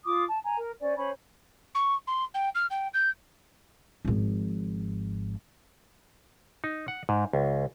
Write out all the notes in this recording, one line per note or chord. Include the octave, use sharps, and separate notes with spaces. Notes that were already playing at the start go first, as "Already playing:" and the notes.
F4 D6 D#6
A5
G#5 A#5
A#4
C#4 C5 D5
C#4 C5 C#5 B5
C#6
C6
G5
F6
G5
G6
G#1 F3
D#4
F#5
G#2
C#2